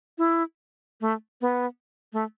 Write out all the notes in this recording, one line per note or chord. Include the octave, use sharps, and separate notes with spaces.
E4
A3
B3
A3